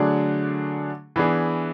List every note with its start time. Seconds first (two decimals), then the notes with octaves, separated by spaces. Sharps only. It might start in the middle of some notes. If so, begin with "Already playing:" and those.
Already playing: D3 F#3 A3 D4 G#4
1.16 E3 B3 D4 G#4